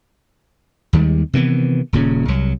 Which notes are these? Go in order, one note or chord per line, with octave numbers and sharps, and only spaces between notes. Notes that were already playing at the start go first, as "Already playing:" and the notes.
D#2 D#3 G3 G#3
C3 D#3 E3 B3
D#1 A#2 C#3 C#4
C2 F#3